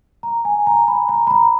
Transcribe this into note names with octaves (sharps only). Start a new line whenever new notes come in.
A#5
G#5
A#5
B5
A#5
B5
A#5